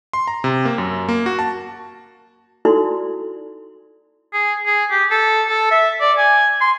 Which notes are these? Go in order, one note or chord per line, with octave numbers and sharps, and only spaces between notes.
C6
A#5
C3
A#3
F#2
A#3
F#4
A5
D#4 E4 F#4 A4 D5 C6
G#4
G#4
G4
A4
A4
E5
D5
G#5
C6